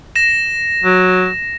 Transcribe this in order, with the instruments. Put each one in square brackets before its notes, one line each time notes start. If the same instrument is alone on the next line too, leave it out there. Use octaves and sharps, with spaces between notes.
[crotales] A#6 E7
[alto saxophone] F#3